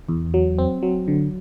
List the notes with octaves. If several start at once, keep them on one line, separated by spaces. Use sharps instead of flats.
E2
F#3
C4
F#3
D3